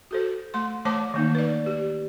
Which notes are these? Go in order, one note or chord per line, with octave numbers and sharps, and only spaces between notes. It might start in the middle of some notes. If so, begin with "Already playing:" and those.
F#4 A4 C5
A3 C6
E3 A3 C5 C#5 A5 D6
D#3 A#3 D#4
B4 D5
G4